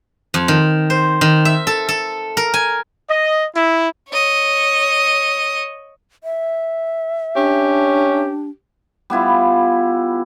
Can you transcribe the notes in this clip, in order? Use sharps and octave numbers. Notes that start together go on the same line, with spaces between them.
F2
D#3
C5
D#3
E5
A4
A4
A#4
G#5
D#5
E4
C#5 D#5
E5
C#4 D4 G4
G3 B3 E4 F4